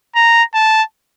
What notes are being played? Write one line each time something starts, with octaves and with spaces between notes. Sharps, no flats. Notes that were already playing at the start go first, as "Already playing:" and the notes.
A#5
A5